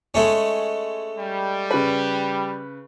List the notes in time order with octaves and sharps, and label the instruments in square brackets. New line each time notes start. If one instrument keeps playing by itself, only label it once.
[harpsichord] G#3 A3 C#4
[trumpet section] G3
[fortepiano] C#3 B4